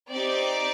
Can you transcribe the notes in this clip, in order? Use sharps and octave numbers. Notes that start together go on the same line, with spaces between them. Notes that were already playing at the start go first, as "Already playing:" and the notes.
C4 D#4 G4 D5